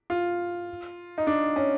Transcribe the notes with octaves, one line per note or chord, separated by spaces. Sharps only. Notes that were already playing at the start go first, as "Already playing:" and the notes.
F4
D#4
D4
C#4